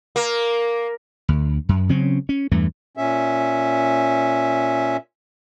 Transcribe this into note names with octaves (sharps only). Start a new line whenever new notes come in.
A#3
D2
F#2
C#3 F#3 C4 C#4
C#4
E2 G2 E3 A3
A#2 C#4 E5